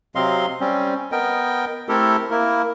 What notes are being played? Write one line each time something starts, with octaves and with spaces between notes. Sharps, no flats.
C3 F#3 C4 D#5 F5 C6
G3 C4 C#4
B3 A#4 D#5 G5
A3 C4 E4 G4 A4 A#4
A#3 E4 A#4